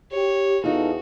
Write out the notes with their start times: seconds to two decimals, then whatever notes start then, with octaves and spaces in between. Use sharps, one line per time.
0.12 G4 C#5
0.64 E2 D#4 F4 F#4 A4